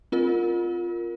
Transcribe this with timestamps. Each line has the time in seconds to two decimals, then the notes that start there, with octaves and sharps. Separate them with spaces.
0.12 C4 F4 A#4